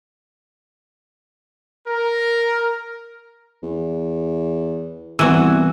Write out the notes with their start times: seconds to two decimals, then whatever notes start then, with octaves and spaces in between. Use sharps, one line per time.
1.87 A#4
3.63 E2
5.19 C2 E3 B3 F#4 E6